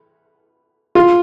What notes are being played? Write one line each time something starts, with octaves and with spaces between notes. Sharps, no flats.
F4